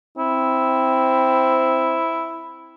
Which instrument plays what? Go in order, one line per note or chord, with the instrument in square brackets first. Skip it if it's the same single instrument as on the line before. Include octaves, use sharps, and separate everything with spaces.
[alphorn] C4 [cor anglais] E4